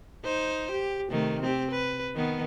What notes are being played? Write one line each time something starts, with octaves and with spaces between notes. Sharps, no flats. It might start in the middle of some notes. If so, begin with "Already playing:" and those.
D#4 C5
G4
C3 D#3 A3
C4 G4
B4
D#3 B3